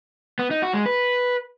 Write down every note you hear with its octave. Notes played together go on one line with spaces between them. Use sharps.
B3
D#4
F#4
G#3
B4